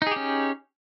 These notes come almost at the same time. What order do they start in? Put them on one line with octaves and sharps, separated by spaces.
D#4 G#4 G4 C#4